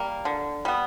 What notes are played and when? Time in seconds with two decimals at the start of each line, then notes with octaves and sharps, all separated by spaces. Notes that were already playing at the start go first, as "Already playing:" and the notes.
Already playing: G3 A#3
0.25 D3
0.65 G3 B3